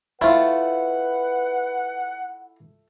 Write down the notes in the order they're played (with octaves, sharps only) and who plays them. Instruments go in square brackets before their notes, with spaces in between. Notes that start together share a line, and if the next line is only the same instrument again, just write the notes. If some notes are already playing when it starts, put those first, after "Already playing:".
[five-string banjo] A3 F4 [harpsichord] E4 [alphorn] B4 [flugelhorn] F#5